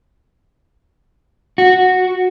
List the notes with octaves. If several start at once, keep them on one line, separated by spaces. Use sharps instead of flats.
F#4